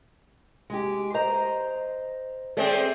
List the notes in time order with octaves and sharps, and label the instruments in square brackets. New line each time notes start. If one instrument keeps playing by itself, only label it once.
[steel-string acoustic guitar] G#3 G4
C5 D#5 A#5
[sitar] G#3 C4 [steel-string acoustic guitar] A4 D5 E5